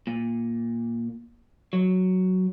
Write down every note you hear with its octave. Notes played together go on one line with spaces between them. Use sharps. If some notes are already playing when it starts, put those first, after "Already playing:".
A#2
F#3